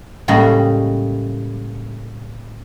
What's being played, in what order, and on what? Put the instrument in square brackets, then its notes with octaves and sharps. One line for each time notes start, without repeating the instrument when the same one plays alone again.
[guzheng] A2 C#3 G3 G#3 A#3